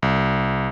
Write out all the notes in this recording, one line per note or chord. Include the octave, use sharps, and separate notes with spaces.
C2